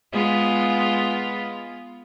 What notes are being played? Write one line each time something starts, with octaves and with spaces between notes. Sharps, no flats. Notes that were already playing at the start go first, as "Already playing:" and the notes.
G#3 B3 F4